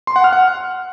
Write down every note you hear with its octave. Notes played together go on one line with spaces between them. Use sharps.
C6
F#5
F6
F#5